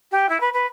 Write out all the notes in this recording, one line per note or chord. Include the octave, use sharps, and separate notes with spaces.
G4
E4
B4
B4